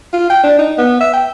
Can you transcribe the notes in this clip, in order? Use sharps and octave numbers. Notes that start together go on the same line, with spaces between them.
F4
G5
D4
D#4
B3
E5
G5